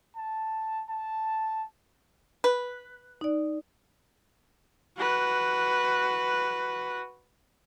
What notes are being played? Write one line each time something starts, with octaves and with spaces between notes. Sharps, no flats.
A5
A5
B4
D#4 D5
F#4 B4